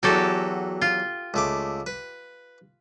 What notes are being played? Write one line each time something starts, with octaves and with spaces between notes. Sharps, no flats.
E2 F#3 F#4 G4 A4
F4
C#2 A3 D6
B4